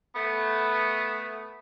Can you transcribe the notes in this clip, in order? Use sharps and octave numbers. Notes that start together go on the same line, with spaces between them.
A3 B3